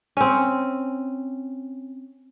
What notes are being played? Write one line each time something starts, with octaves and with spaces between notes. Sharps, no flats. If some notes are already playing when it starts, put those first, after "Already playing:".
C4 C#4